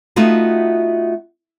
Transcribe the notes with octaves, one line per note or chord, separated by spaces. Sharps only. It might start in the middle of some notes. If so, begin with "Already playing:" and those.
A3 B3 D#4 F4 F#4